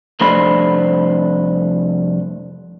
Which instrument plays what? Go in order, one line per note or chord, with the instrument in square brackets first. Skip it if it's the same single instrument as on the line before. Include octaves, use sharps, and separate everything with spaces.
[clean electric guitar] C2 F2 A3 D4 C5 B5